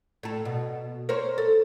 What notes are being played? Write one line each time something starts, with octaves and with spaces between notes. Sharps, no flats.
A2 A4
B2
A#4 C5 C#5
A4